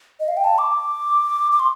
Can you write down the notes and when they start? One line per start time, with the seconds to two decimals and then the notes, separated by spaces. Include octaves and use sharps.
0.20 D#5
0.28 F5
0.37 G5
0.44 A5
0.58 D6
1.52 D6
1.60 C6